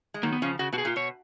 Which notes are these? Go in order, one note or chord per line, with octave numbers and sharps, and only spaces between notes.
G#3
D#3 F#3 A#3
B3
C#3 F3 C#4
C#3 F#4
B2 F#4
G#4
A#2 F4
B2 C#5